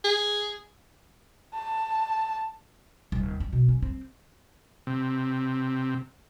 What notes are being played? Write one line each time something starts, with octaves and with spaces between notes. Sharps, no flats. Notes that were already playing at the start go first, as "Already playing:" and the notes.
G#4
A5
D#1
C#4
B2
C#4
C4
C3